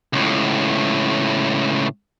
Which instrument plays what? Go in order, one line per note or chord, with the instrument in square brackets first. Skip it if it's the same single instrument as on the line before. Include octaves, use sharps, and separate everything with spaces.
[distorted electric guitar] C#2 A2